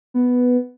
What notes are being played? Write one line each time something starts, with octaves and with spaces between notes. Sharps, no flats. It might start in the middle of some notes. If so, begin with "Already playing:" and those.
B3